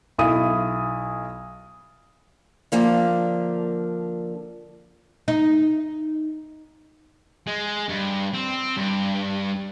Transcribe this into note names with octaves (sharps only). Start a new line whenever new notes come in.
B1 E4 D#6 D#7
D3 F3 A#3 D4
D#4
G#3
G2
C4
G2